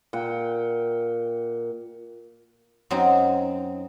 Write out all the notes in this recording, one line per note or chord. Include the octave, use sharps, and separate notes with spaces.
A#2 F#5 G5
F#2 F#3 C4 D#4